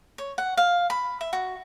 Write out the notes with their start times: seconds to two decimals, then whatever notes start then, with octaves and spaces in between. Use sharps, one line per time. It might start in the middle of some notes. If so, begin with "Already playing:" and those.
0.18 C#5
0.38 F#5
0.57 F5
0.90 B5
1.21 E5
1.33 F#4